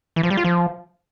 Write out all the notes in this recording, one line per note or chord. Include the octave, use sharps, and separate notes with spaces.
E3
F3
G3
F4
F3